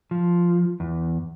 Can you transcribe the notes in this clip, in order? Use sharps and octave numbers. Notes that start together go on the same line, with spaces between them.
F3
E2